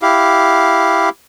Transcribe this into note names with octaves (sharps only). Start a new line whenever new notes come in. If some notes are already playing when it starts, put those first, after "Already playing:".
E4 G4 F5